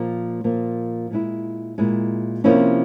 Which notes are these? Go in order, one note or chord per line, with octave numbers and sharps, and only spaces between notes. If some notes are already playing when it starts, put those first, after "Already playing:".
Already playing: A#2 F3 A#3
A#2 F3 A#3
A#2 G#3 E4
A#2 G#3 E4
C3 F3 A#3 C#4 E4